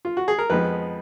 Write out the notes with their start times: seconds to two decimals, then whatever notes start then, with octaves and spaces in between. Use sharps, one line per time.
0.05 F4
0.17 F#4
0.28 G#4
0.39 A#4
0.50 F2 F3 G#3 B3 B4